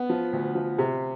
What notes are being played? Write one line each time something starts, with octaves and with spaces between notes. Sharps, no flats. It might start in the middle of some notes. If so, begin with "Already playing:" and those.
Already playing: B3
F3
D2
F3
C3